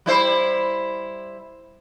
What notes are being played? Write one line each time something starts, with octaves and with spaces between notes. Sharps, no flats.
G3 E4 C5